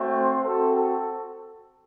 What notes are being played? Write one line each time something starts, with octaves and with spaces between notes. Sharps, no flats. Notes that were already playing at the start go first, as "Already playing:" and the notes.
Already playing: A3 C4 F#4
C5
C4 F#4 A4
A4